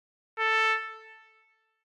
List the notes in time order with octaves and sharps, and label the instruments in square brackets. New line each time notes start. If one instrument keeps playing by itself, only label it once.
[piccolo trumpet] A4